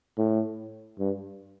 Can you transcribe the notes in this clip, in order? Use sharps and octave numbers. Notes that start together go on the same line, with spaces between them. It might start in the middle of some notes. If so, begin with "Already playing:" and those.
A2
G2